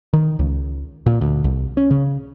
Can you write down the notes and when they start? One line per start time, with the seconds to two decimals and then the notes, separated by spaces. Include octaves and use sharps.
0.13 D#3
0.39 C#2
1.06 A#2
1.21 D2
1.44 C2
1.77 C#4
1.91 C#3